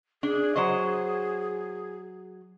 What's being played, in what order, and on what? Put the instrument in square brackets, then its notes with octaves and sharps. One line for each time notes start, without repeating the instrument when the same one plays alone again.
[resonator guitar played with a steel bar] D4 [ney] G#4
[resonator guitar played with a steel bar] F#3 C5 D#5